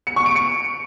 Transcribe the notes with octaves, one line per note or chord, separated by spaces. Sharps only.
C#7
C#6
D7
C#7